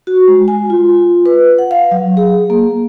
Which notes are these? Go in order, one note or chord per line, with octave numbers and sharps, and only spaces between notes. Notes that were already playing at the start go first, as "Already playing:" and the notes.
F#4
G#3
G#5
F4
B4
F#5
F5
F#3
G#4
A#3